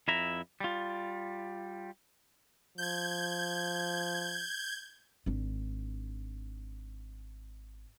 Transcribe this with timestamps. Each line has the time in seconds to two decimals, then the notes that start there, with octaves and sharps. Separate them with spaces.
0.08 F2 E4 E5 A#5
0.60 G3 F4
2.78 F3 G6 G#6
5.26 G#1 D4